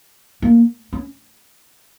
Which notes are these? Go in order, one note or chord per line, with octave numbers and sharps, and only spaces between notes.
A#3
C#4